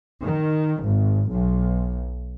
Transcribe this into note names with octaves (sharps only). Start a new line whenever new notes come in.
D#3
G#1
B1